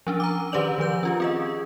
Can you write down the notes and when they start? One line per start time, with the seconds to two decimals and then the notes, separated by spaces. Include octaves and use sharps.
0.07 F3 C#4 D4
0.20 A#5 D6
0.52 D#3 G4 B4 C5 D5 F#7
0.78 D#3 F3 B4 G6
1.03 C#4 F4 G4
1.20 C4 G#4 D#5